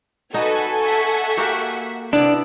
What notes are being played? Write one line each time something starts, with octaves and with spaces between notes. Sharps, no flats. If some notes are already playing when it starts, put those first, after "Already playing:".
D#4 F#4 A4 B4 G#5
E5 F#5 C#6
A#3 F#4 G4
C3 B3 D4 E4 D5